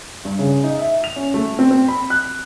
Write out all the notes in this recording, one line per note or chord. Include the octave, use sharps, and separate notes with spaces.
G2
C#3
D#4
E5
F7
C#4
A3
C4
C4
B5
F#6